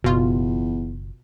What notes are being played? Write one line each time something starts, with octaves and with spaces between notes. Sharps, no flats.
F#1 E2 B2 F4